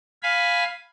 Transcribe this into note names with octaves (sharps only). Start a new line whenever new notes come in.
F5 G#5 B5